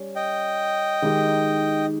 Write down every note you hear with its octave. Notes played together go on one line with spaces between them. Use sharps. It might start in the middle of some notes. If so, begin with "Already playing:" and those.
Already playing: G3 C#4
D#5 G5
D#3 G#3 D#4 G4